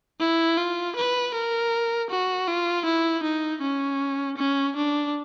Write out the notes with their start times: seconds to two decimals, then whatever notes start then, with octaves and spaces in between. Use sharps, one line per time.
0.20 E4
0.57 F4
0.96 B4
1.34 A#4
2.10 F#4
2.47 F4
2.85 E4
3.23 D#4
3.61 C#4
4.37 C#4
4.75 D4